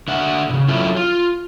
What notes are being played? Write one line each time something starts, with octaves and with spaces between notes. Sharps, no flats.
D3 E5 F#5
A#2 C#3
F#3 C#4 E4 F4 A4
F4